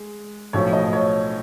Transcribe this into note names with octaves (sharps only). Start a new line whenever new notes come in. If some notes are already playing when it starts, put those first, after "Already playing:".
Already playing: G#3
B1 A2 F3 C#5
D#5
C#5